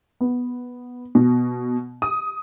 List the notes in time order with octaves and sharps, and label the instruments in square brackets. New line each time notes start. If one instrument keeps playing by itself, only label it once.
[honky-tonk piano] B3
B2
D#6